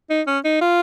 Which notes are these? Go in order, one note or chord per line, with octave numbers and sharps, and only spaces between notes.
D#4
C#4
D#4
F4